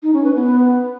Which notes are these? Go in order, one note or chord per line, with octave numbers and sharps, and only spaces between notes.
D#4
C#4
B4
B3